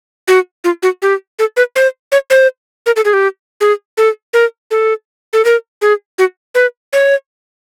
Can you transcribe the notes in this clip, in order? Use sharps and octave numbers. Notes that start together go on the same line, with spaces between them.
F#4
F4
F#4
G4
A4
B4
C5
C#5
C5
A#4
A4
G#4
G4
G#4
A4
A#4
A4
A4
A#4
G#4
F#4
B4
C#5